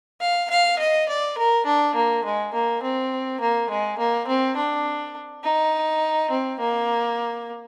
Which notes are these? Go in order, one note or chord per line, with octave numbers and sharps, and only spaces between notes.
F5
F5
D#5
D5
A#4
D4
A#3
G#3
A#3
C4
A#3
G#3
A#3
C4
D4
D#4
C4
A#3